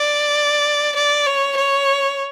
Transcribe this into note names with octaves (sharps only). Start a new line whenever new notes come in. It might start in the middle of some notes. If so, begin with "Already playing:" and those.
Already playing: D5
D5
C#5
C#5